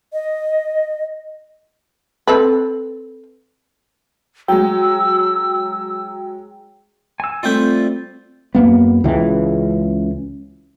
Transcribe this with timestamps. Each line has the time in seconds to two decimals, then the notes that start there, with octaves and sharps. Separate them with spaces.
0.13 D#5
2.27 C4 A4 B4
4.48 F#3 G#3 G5 E6
7.20 G#5 E6
7.43 G3 A3 C4 F4 G6
8.55 F#2 A#3 B3
9.04 C#2 C#3 E3